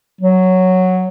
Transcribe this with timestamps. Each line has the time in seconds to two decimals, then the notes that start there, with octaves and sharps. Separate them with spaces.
0.21 F#3